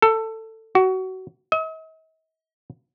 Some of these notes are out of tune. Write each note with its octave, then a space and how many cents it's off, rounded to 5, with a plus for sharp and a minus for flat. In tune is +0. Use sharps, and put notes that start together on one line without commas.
A4 +15
F#4 +25
D#5 +45